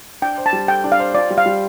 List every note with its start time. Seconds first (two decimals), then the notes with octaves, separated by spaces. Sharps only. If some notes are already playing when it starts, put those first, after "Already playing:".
0.22 D4 G5
0.38 C5
0.46 A5
0.53 G3
0.68 A4 G5
0.84 D4
0.92 F5
1.00 C5
1.15 F4 D5
1.30 G3
1.38 F5
1.46 G3